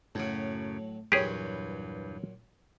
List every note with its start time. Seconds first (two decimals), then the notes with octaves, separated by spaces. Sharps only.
0.15 F#2 A2 C#3 F#3 A4
1.12 E2 G2 A#2 F#3 G4 G#4 B4 C#5